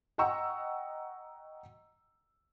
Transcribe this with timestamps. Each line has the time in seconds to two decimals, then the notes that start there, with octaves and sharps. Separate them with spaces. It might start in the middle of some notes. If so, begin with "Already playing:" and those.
0.18 D#5 F#5 G5 A#5 C#6 E6